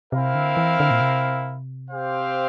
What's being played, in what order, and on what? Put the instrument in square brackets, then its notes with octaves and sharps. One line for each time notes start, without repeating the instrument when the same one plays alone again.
[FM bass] C3 [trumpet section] C4 E4 A#4 F5
[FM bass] D3
E3
D3
A#2
C3
[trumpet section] C4 G4 C5 F5